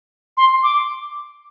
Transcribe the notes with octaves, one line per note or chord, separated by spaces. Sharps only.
C6
D6